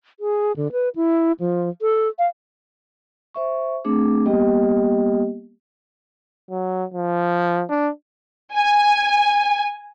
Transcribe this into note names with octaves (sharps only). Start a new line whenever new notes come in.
G#4
D3
B4
E4
F3
A4
F5
C5 E5 C#6
A3 C4 D4 G#4 D6
G3 A#3 B3 G4 D#5 G5
F#3
F3
D4
G#5